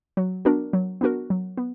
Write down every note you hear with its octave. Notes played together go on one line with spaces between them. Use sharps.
F#3
B3 D4 F#4 A#4
F#3
B3 D4 F#4 A#4
F#3
B3